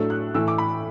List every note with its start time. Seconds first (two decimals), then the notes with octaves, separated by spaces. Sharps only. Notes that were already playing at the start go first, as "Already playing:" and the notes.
Already playing: A2 F#3 A3 D4 E6
0.10 F#6
0.34 A2 E3 A3 E6
0.48 D6
0.58 B5